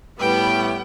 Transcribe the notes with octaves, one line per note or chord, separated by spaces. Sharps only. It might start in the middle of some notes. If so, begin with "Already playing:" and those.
A2 G3 B3 G5